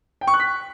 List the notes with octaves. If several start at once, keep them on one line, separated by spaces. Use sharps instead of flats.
G5
C#6
F#6
B6